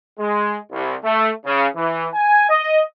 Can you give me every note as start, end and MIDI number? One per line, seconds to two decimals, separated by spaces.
0.19 0.57 56
0.72 0.95 36
1.04 1.29 57
1.46 1.66 49
1.76 2.08 52
2.14 2.48 80
2.50 2.81 75